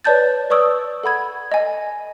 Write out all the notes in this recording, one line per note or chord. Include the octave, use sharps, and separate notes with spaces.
B4 C#5 D5 A5 G6 A6
B4 D5 C#6 D#6 E6
A4 F#5 B5 G#6
D#5 G#5